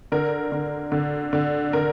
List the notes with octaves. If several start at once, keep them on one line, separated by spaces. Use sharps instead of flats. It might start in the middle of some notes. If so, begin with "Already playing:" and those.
D3 A#4
D3
D3
D3
D3 A#4